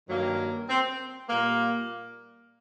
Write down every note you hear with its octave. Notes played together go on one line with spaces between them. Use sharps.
G2 D#3 F#3 A#3
C4
A#2 G3 A#3